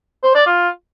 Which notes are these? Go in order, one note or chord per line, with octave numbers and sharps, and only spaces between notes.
C5
D5
F4